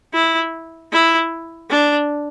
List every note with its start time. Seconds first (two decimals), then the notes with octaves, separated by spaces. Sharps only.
0.14 E4
0.92 E4
1.70 D4